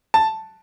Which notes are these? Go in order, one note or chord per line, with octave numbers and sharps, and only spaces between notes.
A5